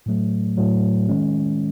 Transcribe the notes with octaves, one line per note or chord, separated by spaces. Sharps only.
A2 F#3 A3
A2 F#3 A3
D#3 G#3 C#4